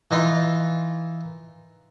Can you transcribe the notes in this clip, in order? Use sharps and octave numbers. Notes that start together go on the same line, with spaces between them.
E3 D#4 F4